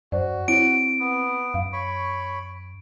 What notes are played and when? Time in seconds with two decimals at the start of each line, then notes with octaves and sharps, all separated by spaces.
0.12 F#2 F#4 C5 D5
0.48 C4 E4 C#5 D7
1.00 B3
1.54 F#2 F5
1.73 C#5 B5 C#6